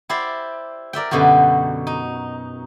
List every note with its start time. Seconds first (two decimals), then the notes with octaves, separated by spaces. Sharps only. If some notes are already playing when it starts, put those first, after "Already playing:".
0.09 E4 G4 C5 D5
0.93 A#4 D5 E5 G5
1.11 F#2 B2 D3 F#4 G4
1.87 D#4